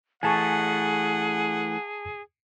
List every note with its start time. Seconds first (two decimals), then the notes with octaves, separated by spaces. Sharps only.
0.23 E3 A3 G#4 F#5 G#5 A5 C#6